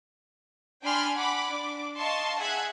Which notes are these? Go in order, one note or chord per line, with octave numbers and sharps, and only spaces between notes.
D4 G5 G#5 B5 C6 F6
F#5 B5 D6
D4 D6
D#5 F5 A5 C6 C#6
G#4 E5 F#5 F#6 G#6